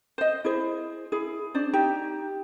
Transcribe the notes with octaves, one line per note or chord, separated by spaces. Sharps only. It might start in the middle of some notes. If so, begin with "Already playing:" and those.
C5 D#5
E4 G#4 C5
E4 G#4
C#4 D4 C5 D5
D#4 G4